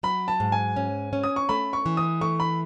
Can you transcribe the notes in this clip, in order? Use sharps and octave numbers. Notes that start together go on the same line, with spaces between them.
F#3 B5
A5
G#2
G#5
C#4
C#4
D#6
C#6
A3 B5
C#6
E3
D#6
A3 C#6
B5